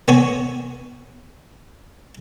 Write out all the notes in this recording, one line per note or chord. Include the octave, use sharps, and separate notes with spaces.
B3 C#5 G#5